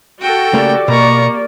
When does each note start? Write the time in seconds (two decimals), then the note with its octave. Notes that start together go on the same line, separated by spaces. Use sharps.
0.21 F#4 A4 G5
0.53 C#3 A3 A#3 G4 D5
0.88 B2 A#3 A#5 C#6